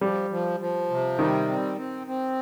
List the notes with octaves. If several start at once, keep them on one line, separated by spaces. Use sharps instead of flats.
F3 G3
F3
F3
C3
D#3 G3
C4
C4
C4